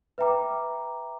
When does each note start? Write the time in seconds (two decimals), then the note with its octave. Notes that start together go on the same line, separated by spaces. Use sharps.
0.18 B4 E5 G5 A#5 D6